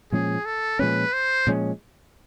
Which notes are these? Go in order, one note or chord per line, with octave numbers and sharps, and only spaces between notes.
A#2 F3 G#3 C#4 G#4
A4
A#2 F3 G#3 C#4 B4
C5
A#2 F3 G#3 C#4